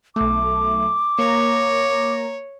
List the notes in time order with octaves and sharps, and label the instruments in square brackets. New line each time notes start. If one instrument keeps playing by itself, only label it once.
[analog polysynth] B1 A3 [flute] D6
[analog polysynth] A#3 A#5 [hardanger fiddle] C#5